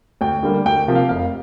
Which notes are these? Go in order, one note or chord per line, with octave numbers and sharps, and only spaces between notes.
D2 G5
D3 G3 A#3
D2 G5
C3 F3 A#3
F5
F1 F5